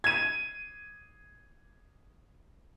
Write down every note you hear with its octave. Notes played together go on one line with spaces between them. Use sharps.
G#6 D#7